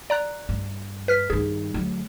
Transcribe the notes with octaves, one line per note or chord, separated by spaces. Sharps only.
D5 A#5 F#6
G2
B4 F6 B6
G2 D#3 G#4
D2 F#3